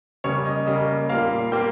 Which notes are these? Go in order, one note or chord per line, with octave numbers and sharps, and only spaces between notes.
C#3 G3 A#3 C#5
D#5
C#3 G3 A#3 D#5
A#2 G3 A#3 F5
A#2 G3 A#3 G5